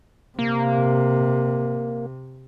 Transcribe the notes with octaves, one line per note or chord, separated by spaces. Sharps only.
C3 A#3